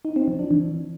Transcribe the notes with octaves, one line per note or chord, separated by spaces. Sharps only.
D#4
C4
F3
D4
E3